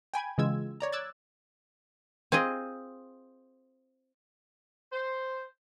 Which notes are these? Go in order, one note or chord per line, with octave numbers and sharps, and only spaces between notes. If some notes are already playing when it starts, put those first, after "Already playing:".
G5 G#5 B5 G#6
C#3 E3 G#3 F4 E6 G#6
C#5 D5 A#5
D6 E6 F#6 G#6 A6
C4 F4 G#4 D#5
C5